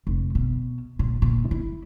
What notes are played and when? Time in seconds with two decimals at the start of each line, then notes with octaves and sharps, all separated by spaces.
0.07 F1
0.35 B2
0.99 A#2
1.22 A#2
1.51 E4